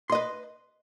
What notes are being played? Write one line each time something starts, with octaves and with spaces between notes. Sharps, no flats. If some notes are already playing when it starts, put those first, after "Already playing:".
B4 D#5 C6